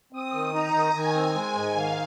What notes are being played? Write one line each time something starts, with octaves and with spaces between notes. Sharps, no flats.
C4 D#6
D#3
D#4 A#5
D#3
D#3 G#5
C4
G#3
G#2
D#3 F5